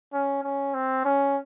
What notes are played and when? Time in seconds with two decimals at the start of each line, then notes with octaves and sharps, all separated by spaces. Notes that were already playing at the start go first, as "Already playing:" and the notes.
0.13 C#4
0.43 C#4
0.74 C4
1.04 C#4